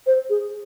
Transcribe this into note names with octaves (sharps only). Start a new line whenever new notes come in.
C5
G#4